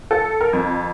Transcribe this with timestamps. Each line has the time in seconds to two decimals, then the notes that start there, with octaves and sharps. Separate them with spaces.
0.11 A4
0.41 A#4
0.53 F2